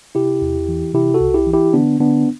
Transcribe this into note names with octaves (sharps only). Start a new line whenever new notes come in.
C3 E4 G4
E2
E3
C3 E4 G4
F#4 A4
C2
E4 G4
E3
E4 G4
D3 B3 D4
D3 B3 D4